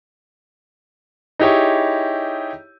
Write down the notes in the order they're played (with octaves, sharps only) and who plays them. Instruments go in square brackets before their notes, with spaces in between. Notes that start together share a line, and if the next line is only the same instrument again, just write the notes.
[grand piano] D#4 E4 G4 G#4 C#5